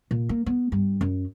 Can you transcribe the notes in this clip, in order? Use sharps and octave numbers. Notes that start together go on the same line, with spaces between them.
A#2
A#3
B3
G2
F#2